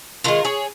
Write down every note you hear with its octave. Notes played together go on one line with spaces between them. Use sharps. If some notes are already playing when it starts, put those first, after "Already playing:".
D#3 G#3 F4 A#4
G#4 C#5